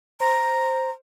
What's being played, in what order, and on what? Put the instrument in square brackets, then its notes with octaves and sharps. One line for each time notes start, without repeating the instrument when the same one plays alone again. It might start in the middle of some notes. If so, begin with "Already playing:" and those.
[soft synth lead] C5 [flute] A#5